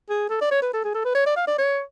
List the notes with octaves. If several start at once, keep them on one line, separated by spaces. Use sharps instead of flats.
G#4
A4
D5
C#5
B4
A4
G#4
A4
B4
C#5
D5
F5
D5
C#5